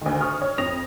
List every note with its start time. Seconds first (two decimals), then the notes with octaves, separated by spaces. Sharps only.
0.01 D2 D#3
0.21 C#6 D#6 F6
0.42 C#5
0.58 F2 D#6 A#6 F7